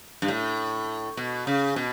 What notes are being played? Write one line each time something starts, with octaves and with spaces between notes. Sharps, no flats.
G2
A2
B2
C#3
B2